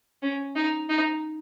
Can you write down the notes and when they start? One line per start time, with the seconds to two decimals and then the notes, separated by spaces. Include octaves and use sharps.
0.22 C#4
0.56 D#4
0.90 D#4